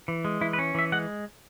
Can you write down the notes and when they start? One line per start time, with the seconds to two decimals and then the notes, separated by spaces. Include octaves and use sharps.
0.08 E3
0.25 G#3
0.41 E3 E4
0.53 B4
0.58 C#4
0.75 E3 E5
0.92 G#3 F#5